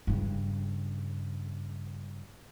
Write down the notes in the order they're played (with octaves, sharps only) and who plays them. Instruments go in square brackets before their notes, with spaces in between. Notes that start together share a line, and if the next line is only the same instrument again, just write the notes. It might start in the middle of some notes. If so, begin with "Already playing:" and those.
[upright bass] G2 C#3